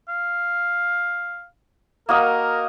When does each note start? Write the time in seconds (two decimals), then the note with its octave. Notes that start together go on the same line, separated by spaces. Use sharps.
0.09 F5
2.09 A#3 F#4 A#4 D#5